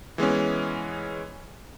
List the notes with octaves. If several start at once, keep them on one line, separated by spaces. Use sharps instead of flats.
E3 G#3 B3 C#4